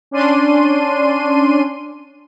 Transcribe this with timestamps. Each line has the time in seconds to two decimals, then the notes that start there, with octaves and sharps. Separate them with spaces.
0.11 C#4 D4 D5 C6 D#7